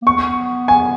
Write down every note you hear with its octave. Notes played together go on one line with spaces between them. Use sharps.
A#3
B3 C#6
G#5